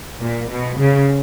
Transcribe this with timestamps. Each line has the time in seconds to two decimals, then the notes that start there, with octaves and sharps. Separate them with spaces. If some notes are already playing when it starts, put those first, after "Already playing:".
0.20 A#2
0.49 B2
0.78 C#3